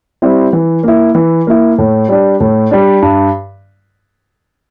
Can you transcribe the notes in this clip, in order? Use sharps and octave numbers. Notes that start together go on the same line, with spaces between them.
G3 C4 E4
E3
A#3 E4
E3
A#3 E4
A2
G3 D4
A2
G3 D4
G2